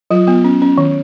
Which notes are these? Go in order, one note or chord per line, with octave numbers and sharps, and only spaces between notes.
F#3 F4
B3 F4
C#4
C#4
D#3